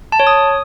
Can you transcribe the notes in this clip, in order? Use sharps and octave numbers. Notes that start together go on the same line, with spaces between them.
A5
C#5
D#6